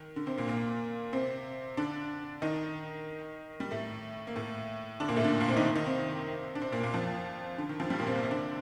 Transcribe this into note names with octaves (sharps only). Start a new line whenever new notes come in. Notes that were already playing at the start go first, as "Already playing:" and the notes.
Already playing: D#3
D3
C3 C4
A#2 A#3
A#2 A#3
C3 C4
D3 D4
D#3 D#4
G3
A2 A3
A#3
A2 A3
D3 D4
A#2 A#3
A2 A3
D3 D4
A#2 A#3
C3 C4
D#3 D#4
D#3 D#4
C3 C4
D4
C3 C4
A#2 A#3
A#2 A#3
F2 F3
D3
D#3
F2 F3
G2 G3
A#2 A#3
C3 C4
A#2 A#3
C3 C4
D3 D4